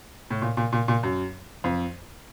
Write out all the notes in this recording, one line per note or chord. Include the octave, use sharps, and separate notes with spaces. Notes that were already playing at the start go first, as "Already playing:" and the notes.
A2
A#2
A#2
A#2
A#2
F#2
F2